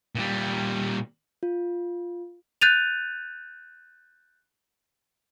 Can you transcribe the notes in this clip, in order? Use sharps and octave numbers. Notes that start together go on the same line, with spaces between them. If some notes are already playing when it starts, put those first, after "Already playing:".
A#2 G3
F4
F#6 G6 A6 D#7 F7